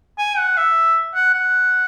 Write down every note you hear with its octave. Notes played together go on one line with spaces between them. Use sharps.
G#5
F#5
E5
F#5
F#5